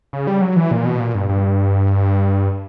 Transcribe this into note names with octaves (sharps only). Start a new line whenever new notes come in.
C#3
G3
F#3
E3
A#2
B2
A#2
G2
G2